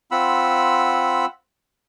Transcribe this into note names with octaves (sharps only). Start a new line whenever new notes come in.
C4 F4 F#5 B5 E6